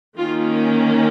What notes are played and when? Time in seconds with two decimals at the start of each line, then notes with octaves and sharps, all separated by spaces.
0.18 D#3 A#3 C#4 F4